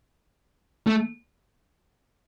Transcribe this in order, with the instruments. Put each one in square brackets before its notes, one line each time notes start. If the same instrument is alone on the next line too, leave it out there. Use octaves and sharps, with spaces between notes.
[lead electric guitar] A3